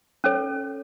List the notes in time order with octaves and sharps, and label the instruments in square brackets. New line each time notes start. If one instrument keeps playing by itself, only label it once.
[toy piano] C#4 A4 C#5